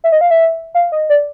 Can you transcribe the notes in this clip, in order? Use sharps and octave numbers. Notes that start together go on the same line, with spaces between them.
E5
D#5
F5
E5
F5
D#5
D5